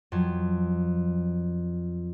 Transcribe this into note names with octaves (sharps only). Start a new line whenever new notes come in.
F2 F#3